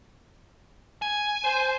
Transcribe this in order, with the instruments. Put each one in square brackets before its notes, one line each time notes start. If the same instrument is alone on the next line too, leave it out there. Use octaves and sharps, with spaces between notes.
[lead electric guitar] G#5
[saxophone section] C5